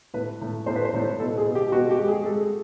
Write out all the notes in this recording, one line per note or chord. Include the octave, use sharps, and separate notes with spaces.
A2 B4
A2
A2 C5
B4
C5
A2 C#5
B2 A4
G#4
B2
G4
B2 F#4
G4
G#3
G#4
G#3 A4